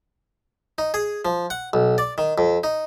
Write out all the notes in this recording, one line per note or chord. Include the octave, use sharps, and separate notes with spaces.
D#4
G#4
F3
F#5
B1
D5
D#3
F2
D#4